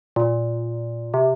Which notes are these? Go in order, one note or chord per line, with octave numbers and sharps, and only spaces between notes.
A#2
C3